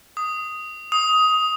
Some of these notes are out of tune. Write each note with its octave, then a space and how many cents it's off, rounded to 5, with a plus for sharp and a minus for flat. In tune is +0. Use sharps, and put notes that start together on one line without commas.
D#6 +0
D#6 +15